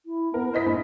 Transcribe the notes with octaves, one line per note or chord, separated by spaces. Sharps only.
E4
B3 A#4
E4 C5 D#5 B6
A#1